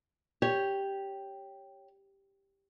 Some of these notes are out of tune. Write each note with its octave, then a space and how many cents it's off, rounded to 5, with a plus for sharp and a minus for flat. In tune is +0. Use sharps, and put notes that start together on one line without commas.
G4 +0 C#5 +0